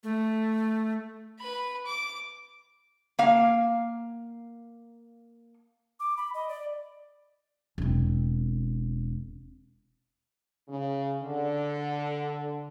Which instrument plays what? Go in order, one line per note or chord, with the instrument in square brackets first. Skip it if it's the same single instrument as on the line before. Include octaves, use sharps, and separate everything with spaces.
[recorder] A3
[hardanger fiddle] B4 B5
D6
[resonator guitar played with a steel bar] A#3 F5
[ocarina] D6
B5
D#5
D5
[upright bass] E1 C4
[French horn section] C#3
D3